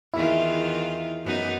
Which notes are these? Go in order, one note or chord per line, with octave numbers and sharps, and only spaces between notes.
E2 D#3 E4 F4
F#2 B3 D#4